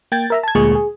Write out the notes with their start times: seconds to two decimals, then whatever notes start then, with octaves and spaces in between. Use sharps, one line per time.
0.12 A#3 G5 G#6 A6
0.30 A#4 E5 A#5
0.43 A5 G#6
0.55 D2 A#2 G#3 G#4 C#6
0.75 G#4